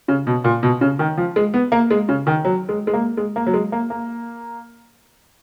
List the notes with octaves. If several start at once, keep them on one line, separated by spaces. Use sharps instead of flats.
C#3
B2
A#2
B2
C#3
D#3
F3
G#3
B3
A#3
G#3
C#3
D#3
F#3
G#3
G#3
A#3
G#3
A#3
F#3
G#3
A#3
A#3